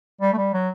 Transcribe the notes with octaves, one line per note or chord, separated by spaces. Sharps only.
G3
A3
G3
F#3